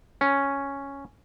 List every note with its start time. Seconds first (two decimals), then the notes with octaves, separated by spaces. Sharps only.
0.21 C#4